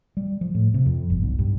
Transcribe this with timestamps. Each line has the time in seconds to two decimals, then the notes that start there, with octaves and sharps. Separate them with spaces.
0.17 G3
0.41 F3
0.55 A2
0.74 C3
0.86 F2
1.10 G1
1.23 B1
1.39 G2